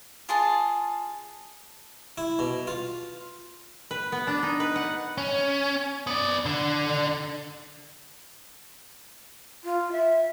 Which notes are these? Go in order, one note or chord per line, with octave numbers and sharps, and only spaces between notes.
F4 G#4 A5
E4
B2
F4
B4
B3
D4
D#4
B4
F#5
C#4
B3 D5
D3 D4
F4
E5